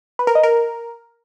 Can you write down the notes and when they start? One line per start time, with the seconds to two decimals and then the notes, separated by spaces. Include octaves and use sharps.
0.19 B4
0.27 A#4
0.35 D#5
0.43 A#4